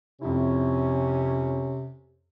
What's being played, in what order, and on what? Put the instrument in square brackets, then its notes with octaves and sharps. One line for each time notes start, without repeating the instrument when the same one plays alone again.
[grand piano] F2 E4 [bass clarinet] C3 [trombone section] C#4